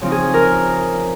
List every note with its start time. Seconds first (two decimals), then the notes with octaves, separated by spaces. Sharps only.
0.01 C#3 F3 C4 D#4
0.12 G#4
0.34 A#4